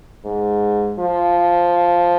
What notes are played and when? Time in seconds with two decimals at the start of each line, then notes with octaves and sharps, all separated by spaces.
0.25 G#2
0.99 F3